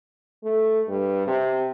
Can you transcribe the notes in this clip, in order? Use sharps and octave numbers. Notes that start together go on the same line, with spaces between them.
A3
G2
C3